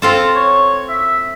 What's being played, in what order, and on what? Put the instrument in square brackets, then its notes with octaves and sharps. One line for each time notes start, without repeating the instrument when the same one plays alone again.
[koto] C4 F4 A4
[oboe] C#5
E5